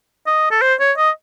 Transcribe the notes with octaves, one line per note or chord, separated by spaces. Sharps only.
D#5
A4
C5
C#5
D#5